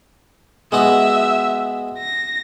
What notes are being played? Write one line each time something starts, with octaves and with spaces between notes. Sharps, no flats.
G#3 B3 F#4 E5
A#6